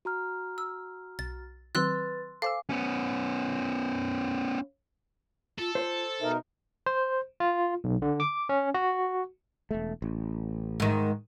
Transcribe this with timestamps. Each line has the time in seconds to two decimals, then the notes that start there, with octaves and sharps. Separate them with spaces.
0.05 F#4 A#5 F6
0.58 E6
1.19 B1 A6
1.75 D#3 F#3 C4 B4 C6 E6 F#6 A6
2.42 A4 C5 F5 G#5 D6 E6
2.69 B3 C#4
5.58 F4 A4
5.75 F4 C5
6.21 B2 D#4 A#4 E5
6.86 C5
7.40 F4
7.84 B1
8.02 D3
8.20 D6
8.49 C#4
8.74 F#4
9.71 E1 A3
10.02 A1
10.80 G#2 D#3